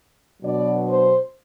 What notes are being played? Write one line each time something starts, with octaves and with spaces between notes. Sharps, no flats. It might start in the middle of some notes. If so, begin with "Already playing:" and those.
B2 F#3 B3 D4 D5
C5